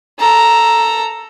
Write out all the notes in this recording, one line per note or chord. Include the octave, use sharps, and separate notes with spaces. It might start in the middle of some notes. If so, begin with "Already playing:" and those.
A4 A#5